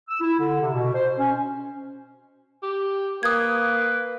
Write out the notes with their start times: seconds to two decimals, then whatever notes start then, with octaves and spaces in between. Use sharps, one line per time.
0.09 E6
0.21 E4
0.39 D3
0.61 C3
0.74 B2
0.94 C5
1.18 C#4
2.63 G4
3.23 A#3 B4 D#6 G#6